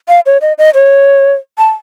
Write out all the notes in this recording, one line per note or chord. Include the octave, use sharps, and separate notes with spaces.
F5
C#5
D#5
D#5
C#5
A5